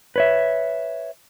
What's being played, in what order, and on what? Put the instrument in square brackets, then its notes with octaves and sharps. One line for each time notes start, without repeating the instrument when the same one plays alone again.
[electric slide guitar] B4 C#5 E5